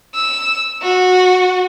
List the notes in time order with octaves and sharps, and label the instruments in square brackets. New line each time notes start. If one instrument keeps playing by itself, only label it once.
[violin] E6
F#4